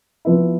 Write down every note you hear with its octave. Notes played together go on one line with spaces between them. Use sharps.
F3 B3 E4